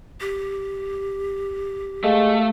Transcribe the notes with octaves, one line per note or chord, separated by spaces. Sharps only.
G4
G#3 A3 F5